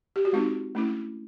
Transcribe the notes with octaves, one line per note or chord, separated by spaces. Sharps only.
G4
F#4
G#3 C4 D#4 F4
A3 C#4 E4